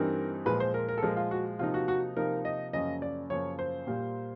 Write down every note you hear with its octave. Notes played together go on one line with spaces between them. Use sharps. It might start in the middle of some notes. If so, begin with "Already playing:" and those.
Already playing: G2 E3 G3 C4 D#4 A#4
A#2 F3 G#3 B4
C5
A#4
A#4
A4
A#2 F3 G#3 A#4
F4
F#4
C3 F3 A#3 D#4 F4
F#4
F#4
C3 F3 A#3 D#4 A#4
D#5
F#2 C#3 F3 A#3 D#5
D5
F#2 C#3 F3 A#3 C#5
C5
A#2 G3 A#3